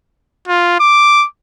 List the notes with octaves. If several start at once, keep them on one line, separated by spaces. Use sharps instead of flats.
F4
D6